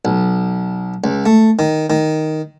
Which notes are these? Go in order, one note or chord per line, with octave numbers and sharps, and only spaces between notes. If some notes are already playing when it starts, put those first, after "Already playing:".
B1
C#2
A3
D#3
D#3